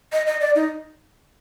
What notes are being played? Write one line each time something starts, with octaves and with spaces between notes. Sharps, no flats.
D#5
D#5
D5
D#4